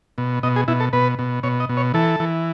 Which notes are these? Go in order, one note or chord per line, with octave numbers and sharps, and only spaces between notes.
B2
B2 D#5
G#4
B2 E4
A4
B2 B4
B2
B2 C#5
D#5
B2
C#5
E3 A4
E3